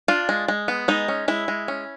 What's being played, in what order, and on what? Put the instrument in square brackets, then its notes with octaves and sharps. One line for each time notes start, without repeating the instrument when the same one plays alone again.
[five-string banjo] D4 F4
G#3
G#3
B3
G#3 D#4
C#4
G#3 E4
G#3
C#4